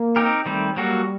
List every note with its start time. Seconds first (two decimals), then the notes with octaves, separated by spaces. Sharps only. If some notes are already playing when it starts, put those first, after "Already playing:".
Already playing: A#3
0.16 C4 D#4 G4 A#4
0.46 D#3 G3 A3 C4
0.76 F#3 G3 A#3 F#4 A4